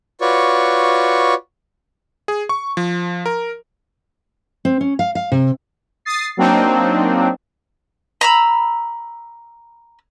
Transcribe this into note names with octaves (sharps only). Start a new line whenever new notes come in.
F4 F#4 B4 C#5 D5 C#6
G#4
C#6
F3
A#4
C4
C#4
F5
F5
C3
D#6 A6 C7
F#3 A#3 C4 D4 D#4
A#5 B5 E6